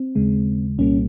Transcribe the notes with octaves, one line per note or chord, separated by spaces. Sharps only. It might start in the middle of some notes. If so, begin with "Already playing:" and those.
Already playing: C4
D#2 C#3 G#3
C2 A#2 G3 A#3 C#4